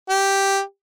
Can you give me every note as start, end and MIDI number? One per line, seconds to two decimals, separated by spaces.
0.09 0.60 67